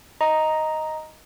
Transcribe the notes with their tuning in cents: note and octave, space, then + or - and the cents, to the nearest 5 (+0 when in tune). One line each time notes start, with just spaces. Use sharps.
D#5 +5 A#5 +0